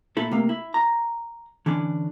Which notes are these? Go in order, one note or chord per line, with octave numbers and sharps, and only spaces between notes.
A#2 E4 A4
C3 A3 A#3
E4
A#5
D3 E3 C#4 D4